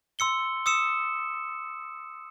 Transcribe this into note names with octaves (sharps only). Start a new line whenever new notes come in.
C6 E6 C#7 G7
D#6 E6 C#7 E7